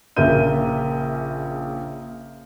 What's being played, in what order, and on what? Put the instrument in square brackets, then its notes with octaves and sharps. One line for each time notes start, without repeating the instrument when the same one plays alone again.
[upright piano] A#1 C#3 A#4 E5 G6 D#7